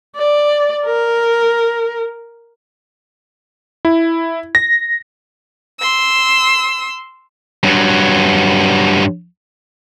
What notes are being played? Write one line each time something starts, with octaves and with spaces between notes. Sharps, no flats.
D5
A#4
E4
A#6
C6 E6
G2 F#3